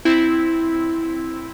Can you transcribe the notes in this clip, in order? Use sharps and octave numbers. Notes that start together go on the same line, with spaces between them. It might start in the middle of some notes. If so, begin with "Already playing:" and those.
C4 E4